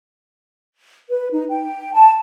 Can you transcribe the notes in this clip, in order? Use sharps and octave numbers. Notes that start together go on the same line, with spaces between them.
B4
D#4
G5
A5